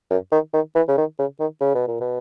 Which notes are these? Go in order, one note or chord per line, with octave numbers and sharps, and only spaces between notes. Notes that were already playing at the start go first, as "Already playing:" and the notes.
F#2
D#3
D#3
E3
C#3
D#3
C#3
D#3
C#3
B2
A#2
B2